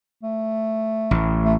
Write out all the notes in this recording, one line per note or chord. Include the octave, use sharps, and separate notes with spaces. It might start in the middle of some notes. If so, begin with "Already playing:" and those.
A3
A1
A3